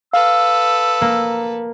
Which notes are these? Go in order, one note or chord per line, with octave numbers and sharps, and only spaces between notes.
A4 B4 F5 E6
A#3